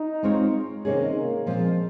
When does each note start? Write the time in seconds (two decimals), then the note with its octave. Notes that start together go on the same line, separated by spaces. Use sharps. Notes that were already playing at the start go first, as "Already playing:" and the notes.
Already playing: D#4
0.23 G#3 C4 F4 A#4 C#5
0.85 C3 D#3 A#3 C#4 D#4 G#4
1.16 A#3
1.46 A#2 F3 G#3 C4